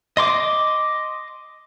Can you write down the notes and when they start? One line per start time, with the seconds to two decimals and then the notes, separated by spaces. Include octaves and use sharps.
0.17 D#5 C6 D6